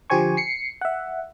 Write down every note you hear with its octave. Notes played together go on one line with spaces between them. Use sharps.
D3 F3 G4 C5 G#5 C#6
C7 C#7
E5 F#5